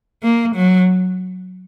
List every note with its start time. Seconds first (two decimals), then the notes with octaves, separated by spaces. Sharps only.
0.23 A#3
0.55 F#3